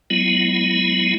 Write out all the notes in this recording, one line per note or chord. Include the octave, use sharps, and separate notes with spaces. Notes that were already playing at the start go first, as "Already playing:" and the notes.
F#3 G#3 B3 E4